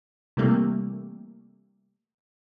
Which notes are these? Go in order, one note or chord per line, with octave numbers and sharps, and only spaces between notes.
C3 E3 G3 A3 A#3